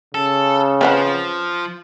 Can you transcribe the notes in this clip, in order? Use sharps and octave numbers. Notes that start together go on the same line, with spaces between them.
C#3 A4
F3 C4 B4 F#5